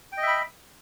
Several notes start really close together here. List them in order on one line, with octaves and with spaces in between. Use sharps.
G5 D#5 E5 B5